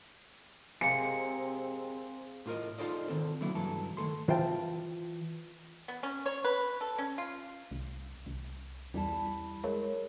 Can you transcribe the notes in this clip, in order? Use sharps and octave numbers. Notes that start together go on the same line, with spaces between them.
C3 G#3 A#3 C4 F5 G#5 C#7
A2 F4 A#4 D#5
D#4 F4 A4 C5 D5 D#5
D#3 F3 C4 A4
D3 F#3 A#3 B3 E4
C#2 G2 E3 F#3 A4 A5
D#3 A3 A4 C6
E3 F4 C5 E5 G5 A5
B3
C#4
C#5
B4
A4
C#4
F4
C2
C2
E2 G3 E4 A5
G#3 A#4 C#5